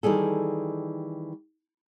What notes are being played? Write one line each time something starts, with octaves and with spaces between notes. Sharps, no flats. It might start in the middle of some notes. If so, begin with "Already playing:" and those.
D#3 E3 G3 G#4 A4